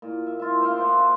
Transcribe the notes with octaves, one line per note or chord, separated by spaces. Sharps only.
A#2
E5
F4 E5
C5 E5 F5 D6
A#3 C5 F#5
A#5